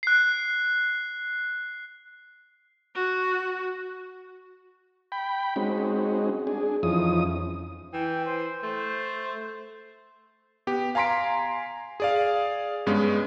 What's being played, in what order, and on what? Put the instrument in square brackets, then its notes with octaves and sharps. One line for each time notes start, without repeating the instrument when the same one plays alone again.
[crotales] F#6 C7
[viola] F#4
[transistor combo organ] G5 B5
G#3 C4 C#4 D#4 F#4
D4 G#4
F2 E3 F3 C#4 D#4 D#6
[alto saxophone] E3 [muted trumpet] G5
[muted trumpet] C5
[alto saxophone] A3 [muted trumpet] C5
[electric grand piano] B3 G4
F5 G#5 A#5 C6 B6 D7
G#4 D5 F5
G2 G#3 B3 C#4